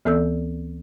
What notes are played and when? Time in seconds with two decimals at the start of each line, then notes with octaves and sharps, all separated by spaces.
0.05 D2 E3 B3 A4 D5 E6